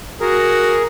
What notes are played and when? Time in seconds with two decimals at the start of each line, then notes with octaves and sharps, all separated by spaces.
0.20 F#4 G#4 A#4